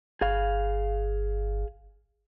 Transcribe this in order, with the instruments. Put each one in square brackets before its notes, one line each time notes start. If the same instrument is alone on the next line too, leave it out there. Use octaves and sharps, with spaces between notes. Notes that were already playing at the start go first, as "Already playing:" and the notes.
[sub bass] G1 [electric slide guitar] G#4 F5